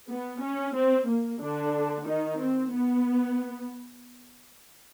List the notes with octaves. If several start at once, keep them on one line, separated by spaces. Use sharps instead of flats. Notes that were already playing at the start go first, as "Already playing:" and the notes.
B3
C#4
C4
A#3
D3 D4
D#3 D#4
C4
B3